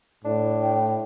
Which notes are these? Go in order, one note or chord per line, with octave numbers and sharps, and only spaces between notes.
A2 D4
G5